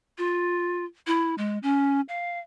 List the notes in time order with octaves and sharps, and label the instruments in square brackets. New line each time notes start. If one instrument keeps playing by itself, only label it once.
[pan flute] F4
E4
G#3
C#4
F5